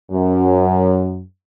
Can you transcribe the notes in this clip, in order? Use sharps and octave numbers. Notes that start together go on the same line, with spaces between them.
F#2